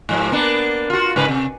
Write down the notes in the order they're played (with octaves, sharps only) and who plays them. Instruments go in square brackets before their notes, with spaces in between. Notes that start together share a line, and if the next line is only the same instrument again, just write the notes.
[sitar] G#2 F3 G3
A#3 B3 D4
F4 F#4
G#2 C#3 B4
C3